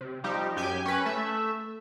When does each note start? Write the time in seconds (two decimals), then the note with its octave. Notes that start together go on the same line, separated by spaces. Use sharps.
0.01 C3
0.24 F3 G3 D#4 G4
0.56 F#2 G4 G#5 G6
0.86 C#4 B4
1.05 A3 E5